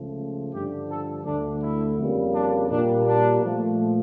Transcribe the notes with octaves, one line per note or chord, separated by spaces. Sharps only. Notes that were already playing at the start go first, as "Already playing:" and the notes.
Already playing: C#2 C#3 F3 A3
G2 D3 F3 G4
A4
D2 D3 A3 D4
E4
F2 C#3 G3 A#3
D4
A#2 G3 A#3 D4
D4
A#2 F3 A3